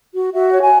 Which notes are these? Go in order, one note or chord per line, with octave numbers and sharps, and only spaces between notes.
F#4
F#4 E5
C#5
G#5